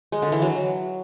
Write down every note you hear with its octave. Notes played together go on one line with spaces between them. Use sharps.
G#3
D3
E3
F#3